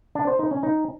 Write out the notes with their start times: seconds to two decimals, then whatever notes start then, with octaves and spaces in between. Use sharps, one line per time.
0.15 D4
0.27 C5
0.39 D#4
0.51 C#4
0.63 D#4